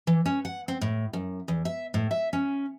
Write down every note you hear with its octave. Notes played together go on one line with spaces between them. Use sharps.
E3
C#4
F#5
C4
A2
F#2
E2
E5
A2
E5
C#4